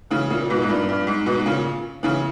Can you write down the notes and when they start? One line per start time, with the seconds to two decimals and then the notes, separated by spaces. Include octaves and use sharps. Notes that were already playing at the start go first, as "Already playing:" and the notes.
0.11 C#3 E3
0.30 A#2 C#3
0.41 A#2
0.50 G#2 B2
0.62 G#2
0.68 G2 A#2
0.89 G2
1.07 G#2
1.26 G#2 B2
1.46 A#2 C#3
2.03 C#3 E3